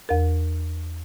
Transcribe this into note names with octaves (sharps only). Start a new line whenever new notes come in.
E2 A#4